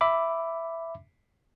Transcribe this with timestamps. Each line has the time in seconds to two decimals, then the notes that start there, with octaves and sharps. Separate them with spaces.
0.01 E5 B5 D6